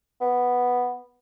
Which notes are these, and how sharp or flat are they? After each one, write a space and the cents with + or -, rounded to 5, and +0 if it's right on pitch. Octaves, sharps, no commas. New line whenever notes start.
B3 +0